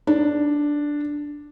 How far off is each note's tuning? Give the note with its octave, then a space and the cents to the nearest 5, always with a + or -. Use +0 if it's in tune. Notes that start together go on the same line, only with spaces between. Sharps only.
D4 +0